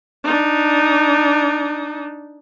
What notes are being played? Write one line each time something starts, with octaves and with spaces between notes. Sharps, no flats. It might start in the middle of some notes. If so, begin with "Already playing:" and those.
D4 D#4